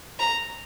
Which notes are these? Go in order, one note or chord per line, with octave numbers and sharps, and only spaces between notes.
A#5